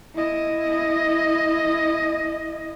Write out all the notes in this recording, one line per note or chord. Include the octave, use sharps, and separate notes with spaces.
E4 D#5